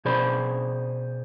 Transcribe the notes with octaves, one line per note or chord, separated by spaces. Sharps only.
B2 G#4 C5 D5 B5